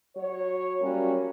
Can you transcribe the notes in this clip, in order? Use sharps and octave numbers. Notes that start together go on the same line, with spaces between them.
F#3 F#4 C#5
F#3 G3 A#3 C#4 F#4